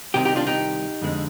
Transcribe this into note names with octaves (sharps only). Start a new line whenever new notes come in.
C2 C3 D#3 D#4 G4
D#4 G4
D4 F4
D#4 G4
F2 D3 G#3